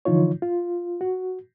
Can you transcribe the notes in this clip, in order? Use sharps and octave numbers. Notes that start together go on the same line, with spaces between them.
D3 E3 F3 D#4 F4 C#5
F4
F#4